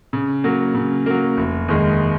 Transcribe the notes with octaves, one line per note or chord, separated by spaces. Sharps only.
C#3
F#3 A#3
C#3
F#3 A#3
F1
D#2 D#3 G#3 D#4